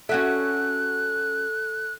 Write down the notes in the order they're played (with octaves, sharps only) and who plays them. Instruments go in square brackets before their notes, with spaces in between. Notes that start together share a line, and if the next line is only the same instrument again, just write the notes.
[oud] C#4 F#4 E5 [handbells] A4 [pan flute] F#6